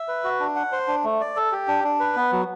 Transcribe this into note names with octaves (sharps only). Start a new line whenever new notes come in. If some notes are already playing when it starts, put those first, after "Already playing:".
Already playing: E5
B4
F#4
D4
F#5
C5
D4
A3
D5
A4
G4
D4
D4
B4
B3
F#3